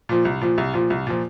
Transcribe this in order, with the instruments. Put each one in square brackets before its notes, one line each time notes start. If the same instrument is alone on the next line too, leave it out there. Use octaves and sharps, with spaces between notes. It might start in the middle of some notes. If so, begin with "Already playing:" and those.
[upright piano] A#2 F3
C2
A#2 F3
C2
A#2 F3
C2
A#2 F3